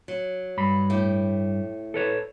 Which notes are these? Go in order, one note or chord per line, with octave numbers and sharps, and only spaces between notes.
F#3
G2 B5
A2 G4
A4 B4 C#5